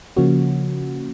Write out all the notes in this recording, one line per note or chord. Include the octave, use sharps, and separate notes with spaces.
C#3 F3 A#3 C#4 F#4